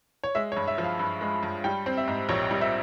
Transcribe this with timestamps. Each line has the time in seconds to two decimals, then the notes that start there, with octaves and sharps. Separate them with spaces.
0.24 C#5
0.35 G#3 E5
0.52 C#5
0.57 G2
0.68 E5
0.78 F3
0.84 F5
0.99 G2
1.21 G#3
1.43 G2
1.64 G3 G5
1.86 C4
1.97 E5
2.08 G#2
2.29 A#1 C#5
2.51 G3
2.61 E5